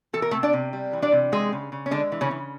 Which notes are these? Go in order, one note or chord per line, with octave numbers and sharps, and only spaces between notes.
E3 A4
A#4
C3 A3 A4
D4 D5
C3
G3
E3
D4 D5
C3
E3 G#3 G#4
C#3
C#3
C#4
D3 G#3 D4
E3
C#3 C#4
C#3